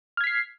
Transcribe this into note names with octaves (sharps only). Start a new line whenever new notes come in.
F6 G#6 B6 C7